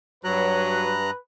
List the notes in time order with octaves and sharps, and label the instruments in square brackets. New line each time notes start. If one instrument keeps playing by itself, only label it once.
[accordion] G2 A#5 F#6 [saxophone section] F#3 [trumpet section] B4